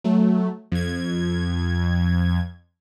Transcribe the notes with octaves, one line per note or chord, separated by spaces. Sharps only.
F#3 A3
F2 G#6